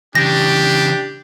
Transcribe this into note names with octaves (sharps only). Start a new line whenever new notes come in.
C#3 E3 D4 G4 A#6